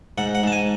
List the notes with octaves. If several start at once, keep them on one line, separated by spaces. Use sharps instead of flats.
G#2 F#5
F#5
G#2 A5
G#5